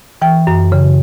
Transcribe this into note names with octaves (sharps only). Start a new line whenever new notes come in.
E3 G5
F#2
C#3